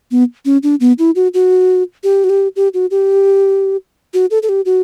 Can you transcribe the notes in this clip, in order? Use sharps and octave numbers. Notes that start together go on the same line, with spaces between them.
B3
C#4
D4
B3
E4
F#4
F#4
G4
F#4
G4
G4
F#4
G4
F#4
A4
A4
G4
F#4